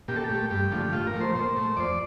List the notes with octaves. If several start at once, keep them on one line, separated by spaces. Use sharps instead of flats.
A#2 G4
A4
G4
A3
G2 G4
D3 F3 A3
A2 F4
A#4
F3 A3
C5
A#2 C5
A3
F2 D5